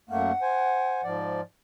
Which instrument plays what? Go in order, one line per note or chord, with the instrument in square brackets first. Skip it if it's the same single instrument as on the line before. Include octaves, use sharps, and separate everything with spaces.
[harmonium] F#2 A3 A#3 [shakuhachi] F#5
[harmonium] C5 G#5
G#2 F3 D5